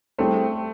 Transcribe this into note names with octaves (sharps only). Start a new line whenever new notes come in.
G3 A3 C4 E4 G#4 C5